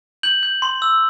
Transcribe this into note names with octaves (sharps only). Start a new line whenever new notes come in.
G6 F#7
G6
C6
E6